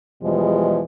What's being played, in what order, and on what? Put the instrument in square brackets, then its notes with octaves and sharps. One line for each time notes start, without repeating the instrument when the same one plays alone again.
[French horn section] E2 B2 E3 F3 G3 G#3